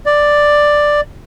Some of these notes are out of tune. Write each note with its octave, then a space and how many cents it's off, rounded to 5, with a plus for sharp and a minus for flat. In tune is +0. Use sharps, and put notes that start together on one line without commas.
D5 +5